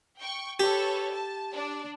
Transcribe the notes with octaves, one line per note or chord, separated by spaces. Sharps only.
G5 C#6
G4 A4 B4 C#5
A5
D4